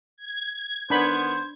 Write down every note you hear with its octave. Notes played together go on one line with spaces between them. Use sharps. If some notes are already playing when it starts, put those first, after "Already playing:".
G#6
D#3 B3 D4 C5 B5